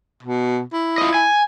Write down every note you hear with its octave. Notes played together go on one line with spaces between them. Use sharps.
B2
E4
F4 D#5
G#5